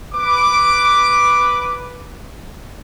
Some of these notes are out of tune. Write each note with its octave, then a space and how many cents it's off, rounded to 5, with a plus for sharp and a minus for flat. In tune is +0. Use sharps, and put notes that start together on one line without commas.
B4 +0 D6 +0